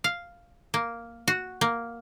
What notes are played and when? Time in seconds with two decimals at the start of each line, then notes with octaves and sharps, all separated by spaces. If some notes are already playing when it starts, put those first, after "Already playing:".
0.04 F5
0.74 A#3
1.28 F#4
1.61 A#3